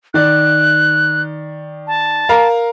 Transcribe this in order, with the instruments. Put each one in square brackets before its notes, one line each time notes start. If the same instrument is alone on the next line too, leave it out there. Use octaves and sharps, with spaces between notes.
[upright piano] D#3 D5 [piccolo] F#6
[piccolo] A5
[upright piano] A#4 F5 A#5